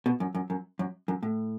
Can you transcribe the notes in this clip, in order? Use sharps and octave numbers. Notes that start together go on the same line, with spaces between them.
B2
F#2
F#2
F#2
F#2
F#2
A2